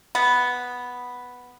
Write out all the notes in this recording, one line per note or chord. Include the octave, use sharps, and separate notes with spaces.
B3